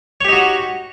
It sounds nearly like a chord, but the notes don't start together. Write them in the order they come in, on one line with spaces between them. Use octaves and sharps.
C#5 G4 D#4 F#4 F#5